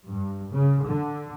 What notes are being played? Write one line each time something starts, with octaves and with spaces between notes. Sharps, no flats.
G2
C#3
D3